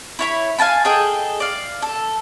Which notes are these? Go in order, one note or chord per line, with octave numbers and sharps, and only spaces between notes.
E4 C#5 B5
F5 G#5 A5 B5
G#4 A4 D#5 G5
D5 F5
A4